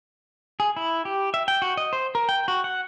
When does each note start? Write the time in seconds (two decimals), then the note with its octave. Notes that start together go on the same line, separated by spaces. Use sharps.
0.60 G#4
0.76 E4
1.05 G4
1.34 E5
1.48 G5
1.62 F#4
1.77 D#5
1.93 C5
2.15 A#4
2.29 G5
2.48 F#4
2.64 F#5